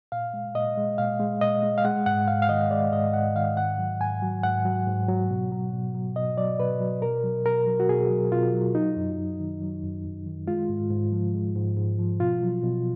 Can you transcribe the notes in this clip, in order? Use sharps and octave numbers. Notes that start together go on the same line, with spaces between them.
A#2 F5
G#3
A#2 D#5
G#3
A#2 F5
G#3
A#2 D#5
G#3
F5
G#3 F#5
G#2 F#5
G#2 F5
F5
D#3 D#5
G#3 D5
G#2 D#5
G#2 F#5
D#3 F5
G#2 F#5
F#3
G#2 G#5
F#3
G#2 F#5
F#3
G#2
F#3
B2
F#3
B2
F#3
B2 D#5
F#3 D5
B2 B4
F#3
B2 A#4
F#3
B2 A#4
F#3
F#4
B2 G#4
F#3
B2 F4
F#3
F#3 D#4
F#2
F#2
D#3
F#3
F#2
F#2
D#3
G#3 F4
G#2
G#2
F3
G#3
G#2
G#2
F3
B2 F4
F#3
B2